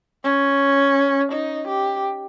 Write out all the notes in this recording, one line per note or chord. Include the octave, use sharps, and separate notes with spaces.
C#4
D#4
G4